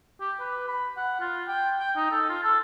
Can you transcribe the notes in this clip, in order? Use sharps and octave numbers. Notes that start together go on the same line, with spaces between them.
G4
B4
B5
F#5
F4
G5
G5
D#4
A4
F4
A4